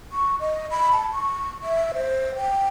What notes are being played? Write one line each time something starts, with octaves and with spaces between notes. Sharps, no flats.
C#6
D#5
B5
A5
C#6
E5
C5
G5